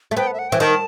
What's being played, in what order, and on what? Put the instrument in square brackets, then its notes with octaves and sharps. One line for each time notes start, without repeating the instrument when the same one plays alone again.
[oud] A3
[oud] B3 [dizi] G5
[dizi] F#5
E5
F#5
[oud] E3 [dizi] G5
[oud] D#3 [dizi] A5